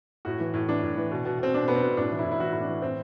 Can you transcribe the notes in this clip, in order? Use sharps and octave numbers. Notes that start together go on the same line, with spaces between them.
A2 F#4
E3
A2
E3 D4
A2
E3
B2
B2
B2 C4
B2 D4
B2 B3
C4
B2
A2 D4
E3
E4
A2
E4
E3 F#4
A2 E4
D4
E3
A2 C4